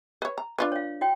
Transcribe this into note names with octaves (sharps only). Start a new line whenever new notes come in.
B4 C#5
A#5
D4 F4 B4
C#5 F5
F#4 C#5 G5